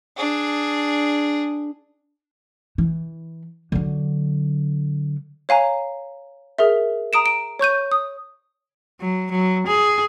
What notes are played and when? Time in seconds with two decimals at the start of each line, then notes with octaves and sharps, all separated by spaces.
0.17 D4 G#4
2.78 E3
3.72 D3 F#3
5.49 C#5 F5 G#5 A#5
6.58 G#4 A#4 E5
7.13 A#5 D#6 D7 E7
7.26 D7
7.59 C#5 C#6 G6 D#7
7.92 D#6
9.01 F#3
9.31 F#3
9.67 G#4